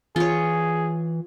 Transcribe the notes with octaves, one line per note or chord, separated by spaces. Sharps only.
E3 F4 G#4 C#5